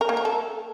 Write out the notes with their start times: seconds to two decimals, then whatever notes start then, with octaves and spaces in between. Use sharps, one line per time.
0.01 A#4
0.09 A#3
0.17 A#4
0.25 A4